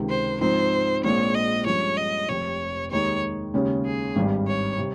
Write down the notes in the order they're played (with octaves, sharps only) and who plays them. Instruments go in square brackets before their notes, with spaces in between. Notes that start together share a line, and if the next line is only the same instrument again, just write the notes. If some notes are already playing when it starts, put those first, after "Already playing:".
Already playing: [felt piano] C#2 C3 D#3
[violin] C5
[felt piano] G#2 F3 C4 D#4 [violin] C5
[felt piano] A#1 A#2 G#3 C4 F4 [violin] C#5
[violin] D#5
[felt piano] G2 F3 G#3 C#4 [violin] C#5
[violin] D#5
[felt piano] F1 F2 C3 [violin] C#5
[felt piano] D#2 D#3 G#3 D#4 [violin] C#5
[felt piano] D#2 C#3 G#3 C#4
[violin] G#4
[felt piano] G#1 G2 G3
[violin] C#5
[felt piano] C3 G3